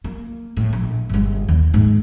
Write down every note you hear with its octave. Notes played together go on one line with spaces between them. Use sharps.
A#3
A2
A#1
G1 G#3
D#2
G#2 D#4